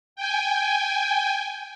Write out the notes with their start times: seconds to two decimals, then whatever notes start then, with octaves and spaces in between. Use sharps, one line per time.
0.16 G5 G#5